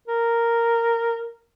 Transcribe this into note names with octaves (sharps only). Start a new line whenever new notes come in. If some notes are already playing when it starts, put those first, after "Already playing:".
A#4